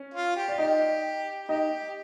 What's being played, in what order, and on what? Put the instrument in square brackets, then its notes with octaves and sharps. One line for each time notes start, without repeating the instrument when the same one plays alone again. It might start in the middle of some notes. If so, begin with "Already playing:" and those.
Already playing: [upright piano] C#4
[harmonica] F4
G4
[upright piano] D5
[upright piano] D#4 D#5 [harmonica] G4
[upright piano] D#4 D#5 [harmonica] G4